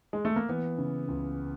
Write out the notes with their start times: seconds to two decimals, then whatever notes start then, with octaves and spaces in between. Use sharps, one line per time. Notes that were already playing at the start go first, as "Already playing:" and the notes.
0.13 G#3
0.25 A3
0.36 A#3
0.49 E3 B3
0.78 C#3
1.08 C#2